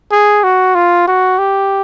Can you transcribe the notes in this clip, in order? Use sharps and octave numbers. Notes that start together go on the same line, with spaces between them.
G#4
F#4
F4
F#4
G4